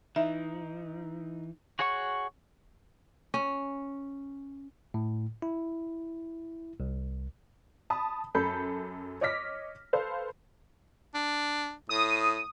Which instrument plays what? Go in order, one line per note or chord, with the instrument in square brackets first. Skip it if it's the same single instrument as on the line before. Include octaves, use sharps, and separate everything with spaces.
[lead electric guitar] E3 [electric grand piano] D#4 [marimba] E5
[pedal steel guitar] F#4 G#4 C#5 F#5 C#6
[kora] C#4
[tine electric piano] A2
E4
C2
[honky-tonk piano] A5 B5 D#6
F#2 A4 B5 G6
C#5 D#5 D6 F6 A#6 B6
A4 B4 C5 F5
[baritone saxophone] D4
[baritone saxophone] A2 [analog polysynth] D#6